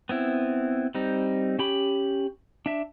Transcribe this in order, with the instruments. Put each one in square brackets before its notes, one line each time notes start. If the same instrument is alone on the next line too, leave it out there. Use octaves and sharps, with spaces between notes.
[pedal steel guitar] B3 C4 E4
G3 C4 D#4
C#4 G4 B5
D4 E5